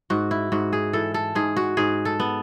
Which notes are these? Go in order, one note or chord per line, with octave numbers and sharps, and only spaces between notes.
G#2 F#4
E4
G#2 F#4
G#4
E3 A4
A4
G#2 G#4
F#4
G#2 G#4
A4
B3